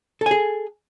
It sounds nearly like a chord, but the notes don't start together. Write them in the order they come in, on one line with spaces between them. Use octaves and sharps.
A4 G#5 G#4